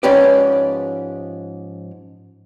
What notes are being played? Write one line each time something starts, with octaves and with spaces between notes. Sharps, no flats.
G#2 F3 C#4 G4 B4 D5